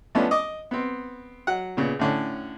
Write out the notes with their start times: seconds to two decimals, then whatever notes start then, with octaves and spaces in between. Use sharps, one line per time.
0.15 F3 A3 B3 C#4 D4
0.31 D#5 D6 D#6
0.71 B3 C4
1.47 F#3 F#5
1.77 A#2 C#3 B3
1.99 A2 D3 C#4